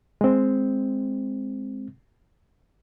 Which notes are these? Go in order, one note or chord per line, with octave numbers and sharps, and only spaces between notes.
G#3 C4